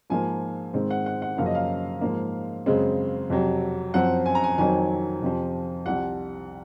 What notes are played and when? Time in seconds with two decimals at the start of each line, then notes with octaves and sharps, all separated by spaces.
0.10 G#2 F3 A#3 G#5
0.73 G#2 D#3 G#3 C4
0.90 F#5
1.06 F#5
1.22 F#5
1.38 F#2 C#3 F3 A#3 F5
1.46 D#5
1.55 F5
2.01 G#2 F3 A#3
2.66 F#2 C#3 G#3 C4
3.30 F2 C3 F#3
3.94 F#2 F3 C4 F#5
4.26 G#5
4.35 A#5
4.44 G#5
4.58 F2 D#3 F#3 C4 G#5
5.22 F2 C3 F3
5.86 C2 C3 F3 F#5